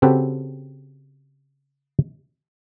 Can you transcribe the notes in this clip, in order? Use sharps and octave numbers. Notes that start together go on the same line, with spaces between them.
C#3 C4 F#4 G4 A4 B4